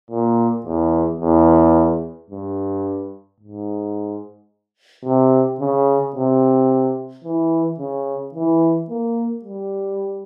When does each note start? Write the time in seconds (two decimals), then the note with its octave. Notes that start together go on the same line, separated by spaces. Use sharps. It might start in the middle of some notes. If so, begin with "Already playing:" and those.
0.11 A#2
0.66 E2
1.21 E2
2.30 G2
3.40 G#2
5.05 C3
5.60 C#3
6.16 C3
7.24 E3
7.79 C#3
8.34 E3
8.90 A#3
9.44 G3